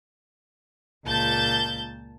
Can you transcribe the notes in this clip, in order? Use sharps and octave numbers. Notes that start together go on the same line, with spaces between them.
C#2 A#2 A5 G6